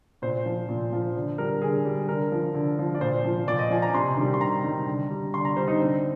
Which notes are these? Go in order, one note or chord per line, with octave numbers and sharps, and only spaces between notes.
A#2 C5
F3
A#2
F3
D3
G3 A#4
D3 G#4
G3
D3 A#4
F3
D3
F3
D5
A#2 C5
F3
A#2 D5
D#5
F3 G#5
A#5
C3 C6
D#3 G3
C6
C3 A#5
D#3 G3
D3
G3
D3 C6
A#5
G3 C5
D#4
D3 C4